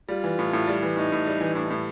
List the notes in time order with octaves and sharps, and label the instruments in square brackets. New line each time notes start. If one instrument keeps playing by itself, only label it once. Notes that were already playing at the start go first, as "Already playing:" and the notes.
[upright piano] G3 [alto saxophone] F4
[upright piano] E3
A2
A2
G3
E3
[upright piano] A2 [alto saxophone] D#4
[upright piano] A2
G3
E3
[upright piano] A2 [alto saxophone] D4
[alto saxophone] D#4
[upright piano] A2 [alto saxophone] E4